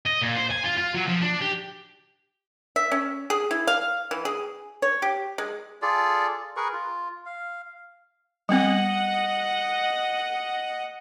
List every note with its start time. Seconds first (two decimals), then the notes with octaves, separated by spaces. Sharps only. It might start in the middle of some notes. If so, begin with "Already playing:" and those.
0.06 D#5
0.21 A#2
0.35 C5
0.50 G#5
0.64 F4
0.77 F4
0.95 F#3
1.07 F3
1.21 D4
1.41 G4
2.76 E5
2.92 C#4
3.30 G#4
3.51 E4
3.67 F5
4.11 E3
4.25 G#4
4.82 C#5
5.02 G4
5.38 G#3
5.82 F4 G#4 A4 D5
6.57 G#4 A#4 B4 C#6
6.73 F4
7.26 F5
8.49 G3 B3 C4 D#5 F#5